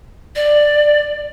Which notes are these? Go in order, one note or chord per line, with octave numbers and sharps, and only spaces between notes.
D5